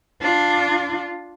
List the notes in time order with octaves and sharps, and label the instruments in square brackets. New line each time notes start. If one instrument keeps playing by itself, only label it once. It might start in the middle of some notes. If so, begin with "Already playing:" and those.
[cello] D4 F4